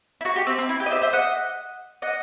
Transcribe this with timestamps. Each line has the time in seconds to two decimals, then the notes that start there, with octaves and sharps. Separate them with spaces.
0.21 E4
0.25 F#4
0.36 G4
0.47 C4
0.58 C4
0.69 E4
0.80 G4
0.86 D#5
0.91 C5 E5
1.02 C5 E5
1.13 D#5 F#5
2.02 D#5 F#5